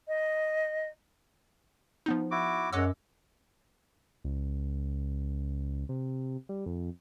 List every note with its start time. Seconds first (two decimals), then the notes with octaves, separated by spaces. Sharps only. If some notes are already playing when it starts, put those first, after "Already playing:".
0.08 D#5
2.06 F3 B3 D#4
2.31 E4 F#4 D6
2.73 F#2 G#3 C#5 D#5 F#5 D6 E6
4.24 C#2
5.89 C3
6.49 G3
6.66 F2